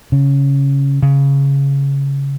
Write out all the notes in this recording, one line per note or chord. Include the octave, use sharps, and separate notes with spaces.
C#3
C#3